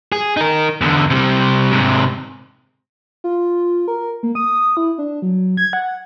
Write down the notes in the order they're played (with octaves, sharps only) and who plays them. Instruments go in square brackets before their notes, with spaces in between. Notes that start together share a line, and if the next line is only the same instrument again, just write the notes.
[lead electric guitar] G#4
D#4 A#4
E2 D3
C3 G3
G#2 C3
[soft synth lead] F4
A#4
A#3
D#6
E4
D4
F#3
G#6
F#5